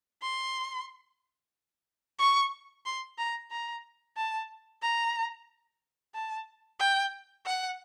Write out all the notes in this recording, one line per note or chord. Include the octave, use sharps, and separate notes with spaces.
C6
C#6
C6
A#5
A#5
A5
A#5
A5
G5
F#5